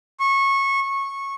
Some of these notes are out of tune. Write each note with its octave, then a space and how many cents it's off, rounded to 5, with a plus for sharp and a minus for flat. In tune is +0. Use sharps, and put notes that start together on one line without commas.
C#6 -20
C#6 -15